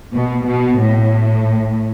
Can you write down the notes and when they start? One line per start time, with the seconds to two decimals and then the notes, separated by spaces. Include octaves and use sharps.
0.12 B2
0.46 B2
0.79 A2